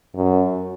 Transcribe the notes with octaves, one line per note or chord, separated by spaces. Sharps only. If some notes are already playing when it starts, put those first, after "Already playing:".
F#2